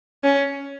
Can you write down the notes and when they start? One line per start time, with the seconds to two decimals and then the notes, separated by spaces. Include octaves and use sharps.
0.24 C#4